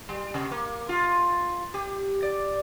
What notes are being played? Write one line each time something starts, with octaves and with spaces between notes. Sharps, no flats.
G3
C3
A#3
F4
G4
D5